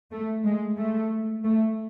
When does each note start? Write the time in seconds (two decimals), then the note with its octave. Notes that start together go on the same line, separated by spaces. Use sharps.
0.11 A3
0.44 G#3
0.78 A3
1.44 A3